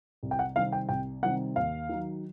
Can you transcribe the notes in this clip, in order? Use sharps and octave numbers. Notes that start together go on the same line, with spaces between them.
C2
G5
F#5
C3 D#3 G3 C4 F5
G5
C2 G5
C3 D#3 G3 C4 F#5
D#2 F5
D#3 F#3